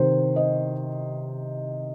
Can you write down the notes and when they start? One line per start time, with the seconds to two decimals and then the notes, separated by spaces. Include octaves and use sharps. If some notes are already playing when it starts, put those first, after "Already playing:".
Already playing: C3 D#3 C5
0.36 D#5